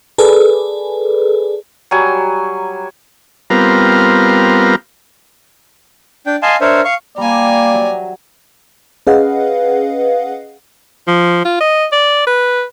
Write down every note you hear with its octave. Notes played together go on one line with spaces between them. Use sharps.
G#4 A4 B4 D5
F#3 G3 G#5
G3 B3 C4 F4 A#4
D4 G5
D#5 F5 G#5 A5 C6
D4 A#4 C5 C#5 E5
F5 C#6
G3 A#3 D5 G#5 A#5
F#3 E5
C#4 G#4 B4 D#5 F5 F#5
F3
F4
D#5
D5
B4